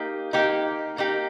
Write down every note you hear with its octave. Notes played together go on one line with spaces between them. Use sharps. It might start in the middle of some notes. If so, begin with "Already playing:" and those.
Already playing: A#3 D#4 G4
A#3 D#4 G4
A#3 D#4 G4